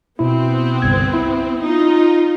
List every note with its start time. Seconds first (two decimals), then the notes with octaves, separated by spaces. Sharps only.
0.19 B2 B3 C4 E4
0.82 G1 C2 G#6
1.14 E4
1.61 D#4 F4